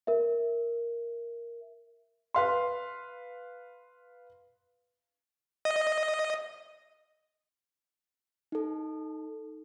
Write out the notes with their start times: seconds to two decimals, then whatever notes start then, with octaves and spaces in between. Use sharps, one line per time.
0.07 A#4 E5
2.34 B4 F5 C6
5.65 D#5
8.52 D#4 A4